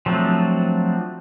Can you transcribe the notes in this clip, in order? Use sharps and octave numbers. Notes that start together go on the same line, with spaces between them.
F3 F#3 A3 C4 D4